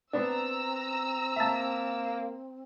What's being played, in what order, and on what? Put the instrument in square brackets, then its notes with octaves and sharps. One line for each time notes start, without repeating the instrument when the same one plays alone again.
[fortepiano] B3 D4 [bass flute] C4 [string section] A#5 E6
[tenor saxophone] A#3 [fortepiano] E5 A5